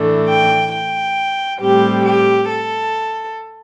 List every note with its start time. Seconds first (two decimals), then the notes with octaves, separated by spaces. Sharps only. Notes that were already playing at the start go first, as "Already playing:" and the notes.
Already playing: A2 E3 A3 D4
0.28 G5
0.72 G5
1.60 A2 G3 C4 G4
2.04 G4
2.48 A4